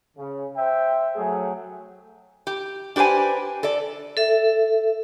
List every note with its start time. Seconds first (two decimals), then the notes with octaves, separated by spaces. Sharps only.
0.18 C#3
0.57 C5 E5 G5
1.16 F#3 A3 G#4
2.47 G4
2.96 D4 G4 B4 C5 G#5
3.63 A4 D5
4.17 A4 E5